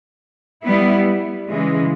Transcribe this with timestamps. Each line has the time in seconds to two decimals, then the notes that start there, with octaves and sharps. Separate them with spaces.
0.62 G3 B3 E4
1.48 C#3 E3 G#3